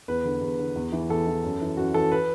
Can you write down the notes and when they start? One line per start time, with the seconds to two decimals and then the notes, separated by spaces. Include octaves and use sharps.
0.08 E2 B4
0.25 D3
0.42 E2
0.59 D3
0.76 E2
0.92 E3
1.09 E2 A4
1.27 E3
1.44 F#2
1.61 E3
1.77 F#2 F#4
1.94 E3 A4
2.12 B4